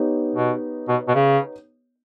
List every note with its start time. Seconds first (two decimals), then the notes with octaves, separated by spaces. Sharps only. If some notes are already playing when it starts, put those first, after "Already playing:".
Already playing: B3 D#4 G4 C#5
0.35 B2
0.88 B2
1.08 B2
1.15 C#3